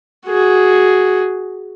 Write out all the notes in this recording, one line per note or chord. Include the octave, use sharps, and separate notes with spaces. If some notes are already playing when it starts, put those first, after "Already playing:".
F#4 G#4